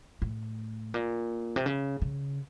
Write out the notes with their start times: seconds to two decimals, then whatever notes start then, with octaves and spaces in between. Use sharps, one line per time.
0.22 A2
0.94 A#2
1.56 C3
1.66 C#3
2.02 C#3